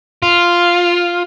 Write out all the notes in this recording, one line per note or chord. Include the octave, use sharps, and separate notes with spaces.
F4